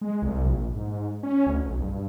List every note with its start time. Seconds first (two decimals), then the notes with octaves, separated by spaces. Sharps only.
0.01 G#3
0.22 C2
0.45 A#1
0.73 G#2
1.23 C#4
1.46 D2
1.64 B1
1.82 G2